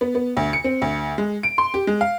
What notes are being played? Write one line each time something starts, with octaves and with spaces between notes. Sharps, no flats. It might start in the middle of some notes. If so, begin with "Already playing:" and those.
B3
B3
D2
C#7
C4
D2
G#3
D7
C6
G4
G#3
F5